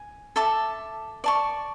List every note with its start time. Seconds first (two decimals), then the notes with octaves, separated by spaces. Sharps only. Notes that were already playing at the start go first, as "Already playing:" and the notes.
Already playing: G#5
0.36 A4 E5 A5 D6
1.24 D5 A5 C#6